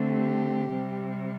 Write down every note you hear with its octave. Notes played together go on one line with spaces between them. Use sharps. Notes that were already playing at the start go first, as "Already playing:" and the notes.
Already playing: D3 A3 C4
G4
C3 G3 C4